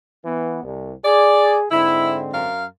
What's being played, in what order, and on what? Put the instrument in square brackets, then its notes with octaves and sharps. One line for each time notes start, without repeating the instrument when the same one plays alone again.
[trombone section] E3 B3
C2
[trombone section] G#4 [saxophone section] D5
[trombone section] G#2 D3 C4 [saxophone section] E4
[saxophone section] F#2 A#4 F5